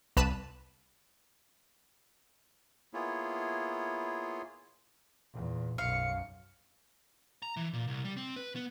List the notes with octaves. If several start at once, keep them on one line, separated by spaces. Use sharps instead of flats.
C2 B4 A5 D#7
A#3 B3 E4 F4 G#4 C#5
E2 A#2
B1 F#2 F5 C#7
A#5
E3
A#2
C2
G3
C4
B4
B3